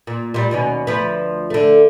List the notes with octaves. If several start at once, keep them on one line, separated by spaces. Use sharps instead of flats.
A#2
A#2 G3
D#2 B2 C#4
D2 F3 B4
D3 A3